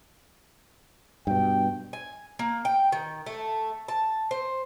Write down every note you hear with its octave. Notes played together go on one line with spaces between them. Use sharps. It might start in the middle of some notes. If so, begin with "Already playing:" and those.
G2 B2 G5
G#5
A#3
G5
D#3
A3
A5
C5